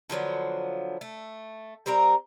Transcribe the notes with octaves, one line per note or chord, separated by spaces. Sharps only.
D3 F3 F#3 B3
A3
G3 C4 A#4 A#5